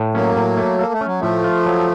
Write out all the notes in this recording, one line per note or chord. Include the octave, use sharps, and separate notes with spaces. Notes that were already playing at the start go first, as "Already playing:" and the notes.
Already playing: A2
F#3 A#3 C#4
A2
A3
A#3 A4
A3
C#4
F#3
A2 F3 A3
F4
F#3